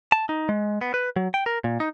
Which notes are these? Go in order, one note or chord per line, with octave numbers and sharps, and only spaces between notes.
A5
D#4
G#3
B3
B4
F#3
G5
A#4
A#2
D#4